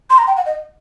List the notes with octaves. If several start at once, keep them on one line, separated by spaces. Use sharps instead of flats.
C6
A#5
G5
F#5
D#5